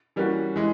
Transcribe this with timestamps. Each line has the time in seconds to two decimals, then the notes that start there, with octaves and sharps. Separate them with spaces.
0.16 E3 G3 A#3 C#4 F#4
0.56 E3 G#3